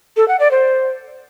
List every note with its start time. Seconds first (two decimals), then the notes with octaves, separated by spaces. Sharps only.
0.17 A4
0.28 F#5
0.40 D5
0.51 C5